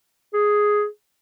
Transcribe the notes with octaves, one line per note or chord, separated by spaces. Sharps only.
G#4